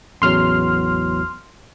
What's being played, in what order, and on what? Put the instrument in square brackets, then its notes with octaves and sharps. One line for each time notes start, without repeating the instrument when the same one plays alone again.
[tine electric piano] A1 E2 F#3 [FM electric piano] C6 F6